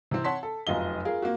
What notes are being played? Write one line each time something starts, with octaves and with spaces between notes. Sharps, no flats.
C3 E3 C4
C#5 F#5 A5 C6 B6
A4
F1 F#2 F4 D#5 G7
F4 G#4 A#4
A#3 F4 F#4